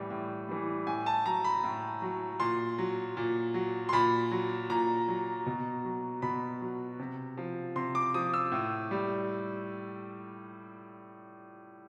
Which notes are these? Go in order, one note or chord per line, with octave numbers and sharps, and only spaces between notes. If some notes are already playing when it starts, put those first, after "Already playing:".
Already playing: A2 E3 G3
A2
E3 G3
A2 G#5
A5
F#3 A#5
B5
A2
F#3
A#2 C6
F#3
A#2
F#3
C6
A#2 B5
F#3
A#2 A#5
F#3
B2
F#3
B2 B5
F#3
C3
F3
C3 C6
D6
F3 D#6
E6
A2
G3